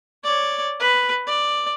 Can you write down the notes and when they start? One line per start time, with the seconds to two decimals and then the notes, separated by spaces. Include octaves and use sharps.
0.24 C#5 D5
0.80 B4
1.27 D5